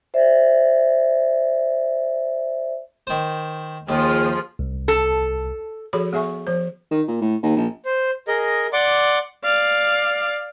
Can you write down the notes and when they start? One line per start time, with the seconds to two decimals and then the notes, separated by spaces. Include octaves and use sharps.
0.14 C5 D5 E5
3.07 D#3 C5
3.89 D#2 F3 F4 G#4
4.59 C2
4.88 A4
5.93 F3 F#4 G#4 A4 C#5 B5
6.13 B3 G#4 E5 G#5 C#6
6.47 F3 C5
6.91 D#3
7.08 A#2
7.21 A2
7.43 D#2
7.56 A#1
7.85 C5
8.28 G#4 A#4 D#5
8.73 D5 F#5 C6 D6
9.44 D5 F5